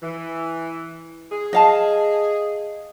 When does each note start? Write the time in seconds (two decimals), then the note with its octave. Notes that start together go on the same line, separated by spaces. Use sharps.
0.02 E3
1.32 G#4
1.53 D#5 F5 A5